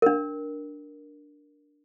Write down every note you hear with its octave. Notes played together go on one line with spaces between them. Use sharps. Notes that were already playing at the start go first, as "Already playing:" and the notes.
D4 A#4